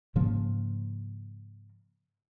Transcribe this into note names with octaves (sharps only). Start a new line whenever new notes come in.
G#2 C#3 F3 A#3